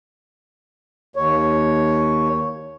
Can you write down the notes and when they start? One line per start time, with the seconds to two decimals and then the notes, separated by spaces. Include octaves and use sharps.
1.16 D#2 C#5